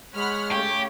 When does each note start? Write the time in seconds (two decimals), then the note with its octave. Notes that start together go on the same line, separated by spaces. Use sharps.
0.15 G#3 C#5 F#5 B5 F6
0.52 C#3 A3 G4